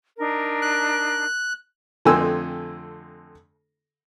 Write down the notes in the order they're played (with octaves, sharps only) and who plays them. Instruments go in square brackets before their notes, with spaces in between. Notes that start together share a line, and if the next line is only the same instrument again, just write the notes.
[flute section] D4 D#4 A#4
[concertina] F#6
[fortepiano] F2 D3 A3 C4 G#5 E6